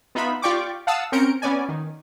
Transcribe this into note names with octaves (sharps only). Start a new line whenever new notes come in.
B3 D#4 F4 E5 B5
F4 G4 D5 G5 C#6 D6
F5 F#5 A5 D#6 E6
C4 C#4 A#4 G6 C#7 D7
B3 C#4 D5 G#5
D#3